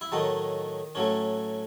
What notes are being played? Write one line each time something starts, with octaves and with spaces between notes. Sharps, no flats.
E4
A2 D#3 F#3 A3 D#4
A2 F#3 A3 C#4